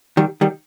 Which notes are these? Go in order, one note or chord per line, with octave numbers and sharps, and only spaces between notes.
D#3 G3
D#3 G3